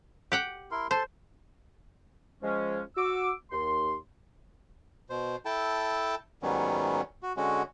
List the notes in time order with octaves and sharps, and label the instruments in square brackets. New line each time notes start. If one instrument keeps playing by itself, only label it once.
[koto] G4 F#5 G5
[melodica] E4 A#4 C6
[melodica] A4 A5 C6 [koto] C5
[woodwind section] F3 G#3 C#4
F#4 D6 E6
D#2 C6
[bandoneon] B2 C5
E4 A4 G5 A5
G#2 D#3 F#3 G3 B3 C#4
F#4
D3 G#3 C#4 F#4